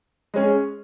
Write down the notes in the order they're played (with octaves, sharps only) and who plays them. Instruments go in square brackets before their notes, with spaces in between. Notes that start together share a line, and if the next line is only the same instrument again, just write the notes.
[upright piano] G#3 C#4 G#4